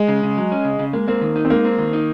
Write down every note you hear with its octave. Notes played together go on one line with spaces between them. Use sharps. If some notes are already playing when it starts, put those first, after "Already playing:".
Already playing: G#3
C#3
C#3
F#3
C#4
C#3
C#3
G#3 A#3
A#3 C4
D#3
D#4
C4
G#3 A#3
C4
D#3
D#4